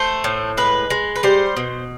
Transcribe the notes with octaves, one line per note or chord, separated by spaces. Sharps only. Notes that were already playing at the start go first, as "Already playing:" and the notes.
Already playing: A3 C5
A2
G#3 B4
G#3
B4
G3 C5
B2